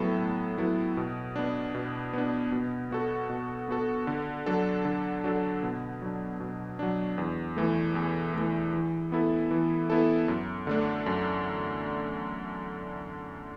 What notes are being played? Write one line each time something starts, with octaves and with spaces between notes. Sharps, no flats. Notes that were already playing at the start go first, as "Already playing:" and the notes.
Already playing: A2 F#3 B3 E4 A4
A2
F#3 B3 E4 A4
B2
B3 D4
B2
B3 D4
B2
B3 F#4 A4
B2
B3 F#4 A4
D3
F#3 D4 A4
D3
F#3 D4 A4
B2
F#3 D4
B2
F#3 D4
E2
E3 A3
E2
E3 A3
E3
B3 E4 A4
E3
B3 E4 A4
F#2
D3 A3 D4
F#2